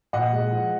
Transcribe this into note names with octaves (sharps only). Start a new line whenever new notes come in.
A#2 D#5 F#5
G#3
F3